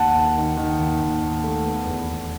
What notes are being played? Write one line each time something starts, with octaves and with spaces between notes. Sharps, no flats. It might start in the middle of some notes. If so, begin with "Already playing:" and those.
Already playing: D#2 F#5 A5
D#2
D#3
D#3
D#2
D#2
D#2
A3
B3
E2
E2